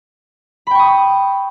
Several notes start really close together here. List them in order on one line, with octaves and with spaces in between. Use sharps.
B5 G5 C#6 D#6